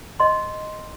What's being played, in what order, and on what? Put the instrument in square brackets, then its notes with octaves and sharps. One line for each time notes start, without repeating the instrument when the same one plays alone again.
[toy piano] D#5 C6